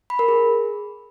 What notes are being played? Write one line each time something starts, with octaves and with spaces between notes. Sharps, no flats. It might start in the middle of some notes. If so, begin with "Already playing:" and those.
B5
A#4
G#4